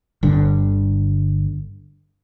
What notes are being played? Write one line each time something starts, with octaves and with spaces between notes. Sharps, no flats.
G1 G2 D3